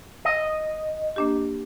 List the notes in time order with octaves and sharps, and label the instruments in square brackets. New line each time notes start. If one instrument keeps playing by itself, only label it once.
[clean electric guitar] D#5
[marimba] A#3 D4 G4